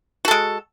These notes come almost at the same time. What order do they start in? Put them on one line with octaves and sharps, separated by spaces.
F#4 A4 G#3